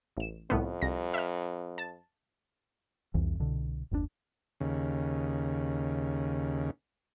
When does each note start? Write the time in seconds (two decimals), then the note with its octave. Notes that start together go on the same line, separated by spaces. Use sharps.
0.17 A1 E7
0.50 C2 F2 A2 B3
0.82 C2 A#6
1.14 E5 F6
1.78 A5 A6
3.14 C2 F2 E3
3.39 C2 B2 D3
3.91 F#1 D#2 C3 D4
4.60 D#2 C#3